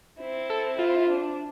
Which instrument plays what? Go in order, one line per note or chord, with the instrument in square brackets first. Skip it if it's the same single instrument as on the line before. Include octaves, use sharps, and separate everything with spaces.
[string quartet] C4 E4
[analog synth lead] A4
F4
[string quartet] D4